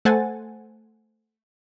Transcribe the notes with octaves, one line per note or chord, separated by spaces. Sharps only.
A3 A4 C5 F#5 G#5 A6